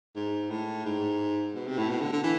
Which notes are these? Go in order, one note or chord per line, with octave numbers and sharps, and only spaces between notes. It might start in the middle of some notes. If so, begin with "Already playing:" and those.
G#2
A2
G#2
B2
C3
A2
B2
D3
D3
E3